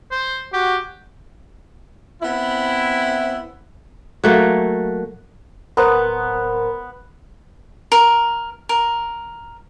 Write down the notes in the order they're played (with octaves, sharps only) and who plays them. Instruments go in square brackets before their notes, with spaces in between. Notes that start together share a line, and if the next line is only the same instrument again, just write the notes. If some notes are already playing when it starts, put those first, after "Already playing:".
[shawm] C5
[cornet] F#4 [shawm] G4
[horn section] B3 C4 E4
[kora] F#3 A3 A#3
[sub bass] D1 [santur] B3 [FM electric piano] A#4 C5 F#5
[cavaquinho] A#4
A#4